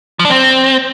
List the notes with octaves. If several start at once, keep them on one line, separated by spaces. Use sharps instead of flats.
F3
D4
C4